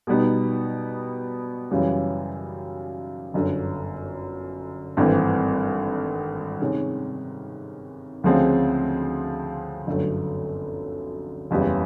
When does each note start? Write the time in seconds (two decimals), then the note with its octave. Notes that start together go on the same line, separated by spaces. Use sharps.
0.07 B2 G3 B3 D#4
1.71 F#2 C#3 E3 G3
3.34 G1 F#2 D3
4.97 G#1 G2 E3 A3 C4
6.61 C3 D#3 G#3 C#4
8.24 D2 C#3 F3 G#3 C4
9.87 G1 F#2 D3 F#3 A3
11.51 F#1 E2 C#3 E3 G3